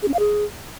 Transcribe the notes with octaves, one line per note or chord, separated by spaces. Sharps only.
G#4
C#4
F5
G#4